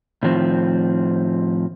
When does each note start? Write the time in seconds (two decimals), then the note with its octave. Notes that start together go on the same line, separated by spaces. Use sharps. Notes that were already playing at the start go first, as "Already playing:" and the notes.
0.23 A2 D#3 F3 C4